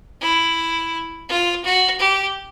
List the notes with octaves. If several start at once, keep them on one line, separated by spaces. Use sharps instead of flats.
E4
F4
F#4
G4